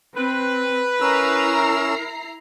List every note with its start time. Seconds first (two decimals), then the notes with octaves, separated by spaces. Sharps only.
0.15 C4 B4
1.01 C#4 E4 A#4 A#5 E6 C7